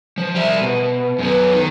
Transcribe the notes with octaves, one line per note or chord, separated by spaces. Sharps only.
F3
G3 E5
B2
F#2 B3
D#3